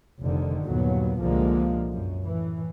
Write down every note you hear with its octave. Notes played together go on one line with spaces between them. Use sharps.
F1 D3 D#3
G1 D#2 A#2 F#3 B3
C2 A#2 D3 F3 G#3 A#3
F#2
A2 E3